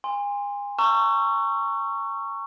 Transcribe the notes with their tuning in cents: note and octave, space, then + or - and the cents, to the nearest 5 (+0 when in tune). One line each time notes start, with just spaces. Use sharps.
G#5 -35 C6 +0
A#5 -35 C#6 +0 E6 +40